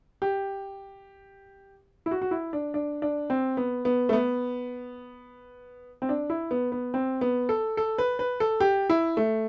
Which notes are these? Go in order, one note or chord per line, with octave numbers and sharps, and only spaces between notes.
G4
E4
F#4
F#4
E4
D4
D4
D4
C4
B3
B3
A3
B3
C4
D4
E4
B3
B3
C4
B3
A4
A4
B4
B4
A4
G4
E4
A3